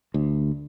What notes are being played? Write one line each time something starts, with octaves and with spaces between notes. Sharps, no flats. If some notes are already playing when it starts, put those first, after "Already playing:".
D2